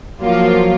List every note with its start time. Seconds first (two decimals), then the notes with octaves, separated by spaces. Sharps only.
0.22 F3 F#3 A#3 F4